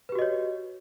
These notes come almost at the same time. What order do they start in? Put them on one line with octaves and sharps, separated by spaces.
B4 G4 F#4 D#5 C#5